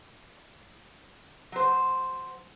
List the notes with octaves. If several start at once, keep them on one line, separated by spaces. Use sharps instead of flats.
F#3 C5